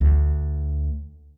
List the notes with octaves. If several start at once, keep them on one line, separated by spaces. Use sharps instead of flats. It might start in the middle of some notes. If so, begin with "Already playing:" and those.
D2